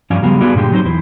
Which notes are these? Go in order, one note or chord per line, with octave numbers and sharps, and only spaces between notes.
G2 F3 C#4 D5 F5 G#5
C#3 F#3 G3 B3 F5
B3 F#4 G#4 C5 D5 F5
G2 A#2 D3 G#3 G4
F#3 C4 D#4 F#4 A#4 C5
E2 E4 C5